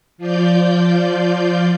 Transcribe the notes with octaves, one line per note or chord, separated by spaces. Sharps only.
F3 F4 D5 G6